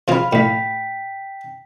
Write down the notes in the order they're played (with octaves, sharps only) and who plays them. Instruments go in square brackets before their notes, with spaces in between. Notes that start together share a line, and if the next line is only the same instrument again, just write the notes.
[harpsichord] C#3 C4 F4 [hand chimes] F5 B5
[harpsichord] A2 [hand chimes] G5 B6